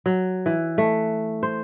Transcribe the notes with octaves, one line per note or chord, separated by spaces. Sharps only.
F#3
E3
A3
C5